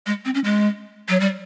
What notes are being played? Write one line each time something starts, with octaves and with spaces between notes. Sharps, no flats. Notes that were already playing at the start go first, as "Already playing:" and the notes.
G#3
C4
C#4
G#3
F#3
G3